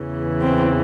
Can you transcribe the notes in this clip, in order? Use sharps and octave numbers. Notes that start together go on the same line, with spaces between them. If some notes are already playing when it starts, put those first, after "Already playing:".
Already playing: E2 C#3 E3
C4